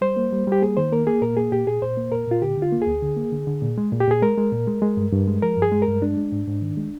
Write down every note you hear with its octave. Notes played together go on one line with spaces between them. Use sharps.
G3 C5
A#3
G3
G3 G4
A#3 G#4
D#3 C5
A#3 A#4
A#3 G#4
A#2 A#4
A#3 G#4
A#2 G4
A#2 G#4
A#2 C5
A#3
A#2 A#4
A#2 F4
D3 G4
D3
F4
A#3
G#4
D2
D3
A#3
D3
D3
A#2
G#3
A#2
G4
A#2 G#4
G#3 A#4
G#3
A#2
G#3
G#3
G2
G2
G#3
F3 A#4
G2 G#4
G#3
A#4
G2
G#3 D4
G#3
G#2
G#2
D#3
G#3